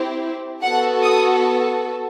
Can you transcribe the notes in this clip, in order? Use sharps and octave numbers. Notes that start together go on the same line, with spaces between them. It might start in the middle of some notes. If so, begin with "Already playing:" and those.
Already playing: C4 E4 G4
B3 F#4 A4 F#5
D#6